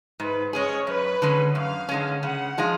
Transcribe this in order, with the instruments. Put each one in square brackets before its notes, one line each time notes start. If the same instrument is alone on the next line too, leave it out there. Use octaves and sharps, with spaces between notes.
[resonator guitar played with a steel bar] G#2 [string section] B4
[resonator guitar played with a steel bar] G#3 C#4 G#4 [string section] C#5
[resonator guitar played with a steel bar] F#2 [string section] B4
[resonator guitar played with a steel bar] D3 G#3 C#4
[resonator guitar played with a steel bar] F#2 [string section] F5
[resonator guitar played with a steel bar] D3 G#3 C#4
[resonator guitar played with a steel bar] C#3 [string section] F#5
[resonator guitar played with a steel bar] F3 G#3 D4 F4